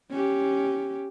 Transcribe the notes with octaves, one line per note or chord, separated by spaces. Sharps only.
C#4 G4